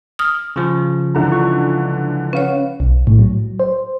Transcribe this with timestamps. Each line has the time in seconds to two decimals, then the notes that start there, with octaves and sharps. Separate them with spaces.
0.19 D#6 F6
0.56 C#3 F3
1.15 C#2 D3 E3 A#5
1.32 F4 C#6
2.33 C#4 B4 C#5 F5 F#5
2.80 B1
3.07 A2
3.18 F#3
3.60 C5